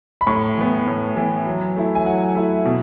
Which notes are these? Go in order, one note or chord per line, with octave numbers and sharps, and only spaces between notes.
B5
A2 C#6
E3 B3
A2
E3 B3
F#3
A3 E4
G#5
F#3 F#5
A3 E4
B2